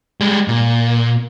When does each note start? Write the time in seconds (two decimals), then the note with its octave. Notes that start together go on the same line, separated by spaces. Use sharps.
0.21 G3 G#3
0.48 A#2